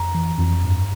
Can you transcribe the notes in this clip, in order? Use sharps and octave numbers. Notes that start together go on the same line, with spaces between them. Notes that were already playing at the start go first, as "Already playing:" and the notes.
Already playing: F2 A#5
E3
F2
G2